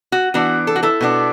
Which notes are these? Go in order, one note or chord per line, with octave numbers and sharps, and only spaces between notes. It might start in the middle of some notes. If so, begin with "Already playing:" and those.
F#4
E3 B3 D4 F#4
A4
F#4
E4 A4
B2 B3 D4